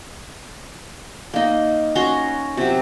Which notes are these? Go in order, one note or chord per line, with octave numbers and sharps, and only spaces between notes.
A#3 D#4
C#4 F#4 A#5 C6
C3 F#3